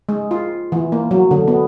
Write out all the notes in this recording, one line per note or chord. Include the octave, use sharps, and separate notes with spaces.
G#3
F4
E3
A#3
F#3
D3
B3